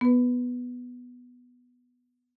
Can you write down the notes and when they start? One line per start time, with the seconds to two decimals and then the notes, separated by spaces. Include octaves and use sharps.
0.01 B3 B4